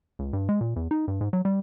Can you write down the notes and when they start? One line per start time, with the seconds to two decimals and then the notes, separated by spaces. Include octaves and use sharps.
0.19 C#2
0.33 G2
0.49 G#3
0.61 A#2
0.76 E2
0.91 D#4
1.08 G2
1.21 G#2
1.33 F#3
1.45 G3